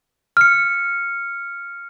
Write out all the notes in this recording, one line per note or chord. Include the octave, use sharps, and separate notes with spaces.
F6 C#7